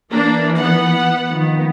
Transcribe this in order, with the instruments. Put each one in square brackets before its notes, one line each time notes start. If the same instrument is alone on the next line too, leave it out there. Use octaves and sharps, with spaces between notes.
[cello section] E3 [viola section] A#3 D4
[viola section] B3 F#5
[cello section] D#3 F3 B3